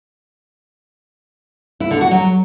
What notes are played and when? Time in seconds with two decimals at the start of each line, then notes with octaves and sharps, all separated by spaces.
1.80 E4
1.91 D3
2.01 F#4
2.11 F#3